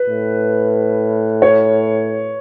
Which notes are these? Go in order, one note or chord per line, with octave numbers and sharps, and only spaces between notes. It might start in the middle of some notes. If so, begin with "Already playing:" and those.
Already playing: B4
A2
C#5